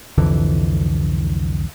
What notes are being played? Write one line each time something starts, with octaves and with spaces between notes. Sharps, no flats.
C2 F2 D3 E3